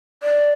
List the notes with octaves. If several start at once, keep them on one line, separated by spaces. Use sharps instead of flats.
D5